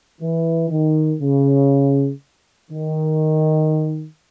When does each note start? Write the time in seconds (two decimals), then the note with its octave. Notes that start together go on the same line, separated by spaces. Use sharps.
0.21 E3
0.70 D#3
1.21 C#3
2.71 D#3